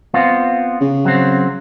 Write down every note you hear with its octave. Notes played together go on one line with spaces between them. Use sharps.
B3 C4 F4
C#3
F#3 C4